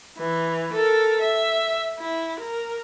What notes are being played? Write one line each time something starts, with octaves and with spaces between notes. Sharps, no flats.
E3
A4 A#4
E5
E4
A#4